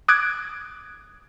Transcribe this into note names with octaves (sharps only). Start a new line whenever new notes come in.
D6 D#6 F#6 G#6 D7